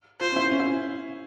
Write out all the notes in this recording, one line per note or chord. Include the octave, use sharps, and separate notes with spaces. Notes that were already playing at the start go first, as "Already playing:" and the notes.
F4 C5
C#4
E4
C#4
E4